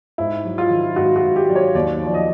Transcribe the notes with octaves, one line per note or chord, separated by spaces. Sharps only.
G#2 E4
F#3
F4
D#3
G#2 F#4
F#4
G#2
G4
F#3 D5
C#5
D#2 D5
F3 D5
D#5